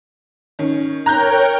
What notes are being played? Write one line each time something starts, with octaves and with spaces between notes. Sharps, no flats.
D#3 C#4
A#4 C#5 G5 A#5 F#6 G6